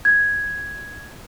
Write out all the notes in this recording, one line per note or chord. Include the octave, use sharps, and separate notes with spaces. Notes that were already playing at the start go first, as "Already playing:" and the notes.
G#6